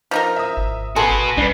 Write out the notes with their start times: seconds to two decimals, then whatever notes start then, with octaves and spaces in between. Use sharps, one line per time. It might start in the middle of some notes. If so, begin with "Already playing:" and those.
0.11 F3 D#4 A#4
0.36 E5 D#6
0.57 G#1
0.96 F#4 G#4 A4 B4 A5 C6
1.37 B1 G2 D4 B4